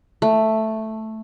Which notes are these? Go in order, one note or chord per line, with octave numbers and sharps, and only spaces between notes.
A3